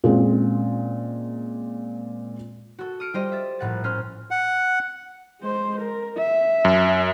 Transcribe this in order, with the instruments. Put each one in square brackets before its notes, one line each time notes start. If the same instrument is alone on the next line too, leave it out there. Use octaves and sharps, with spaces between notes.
[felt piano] A#2 G#3 C4 C#4
[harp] F#4 A4
D#6 F6 C#7 D7
G3 F4 G4 C5 D#5
E5 A6
A#1 A2 F#5 A6
C#4 C5 F6
[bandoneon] F#5
[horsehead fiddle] G#3 C5
A#4
E5
[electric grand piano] F#2